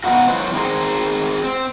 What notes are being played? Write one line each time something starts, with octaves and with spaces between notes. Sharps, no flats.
B2 D3 B3 D#4 F4 F#4
F#3 C#4 E4 F4 B4 C5
C4 D#4 G#4 A#4 C5
C4